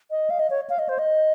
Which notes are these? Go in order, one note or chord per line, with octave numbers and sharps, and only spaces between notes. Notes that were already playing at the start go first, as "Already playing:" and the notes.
D#5
F5
D#5
C#5
F5
D#5
C5
D#5